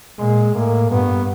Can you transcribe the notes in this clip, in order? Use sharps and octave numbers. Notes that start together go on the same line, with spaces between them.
A#2 G#3
A2 A#3
G2 B3